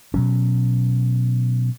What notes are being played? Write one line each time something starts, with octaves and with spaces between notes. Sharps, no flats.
B2 F#3 C#4